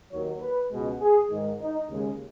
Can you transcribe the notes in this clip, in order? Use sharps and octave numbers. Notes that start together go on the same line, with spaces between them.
D#2 D#3 F#3 C#5
B4
C#2 B2 G#3
G#4
G#2 D#3 G#3
D#4
D#2 C#3 G#3